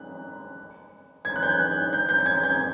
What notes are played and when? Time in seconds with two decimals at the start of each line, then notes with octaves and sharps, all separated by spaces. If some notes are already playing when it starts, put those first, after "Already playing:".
Already playing: F#6
1.25 G#6
1.36 F#6
1.43 G6
1.59 F#6
1.93 G6
2.09 G6
2.26 G#6
2.44 G6